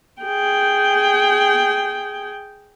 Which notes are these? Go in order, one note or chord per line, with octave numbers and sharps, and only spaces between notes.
G#4 G5